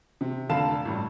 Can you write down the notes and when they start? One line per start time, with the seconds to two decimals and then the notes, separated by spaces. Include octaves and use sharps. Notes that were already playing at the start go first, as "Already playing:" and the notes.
0.21 C3
0.49 F1 D3 F5 A5 B5 E7
0.85 A1 G2